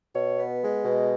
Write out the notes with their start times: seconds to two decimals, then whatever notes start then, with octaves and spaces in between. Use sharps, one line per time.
0.15 B2 C#5
0.38 B3
0.61 G#3
0.84 B2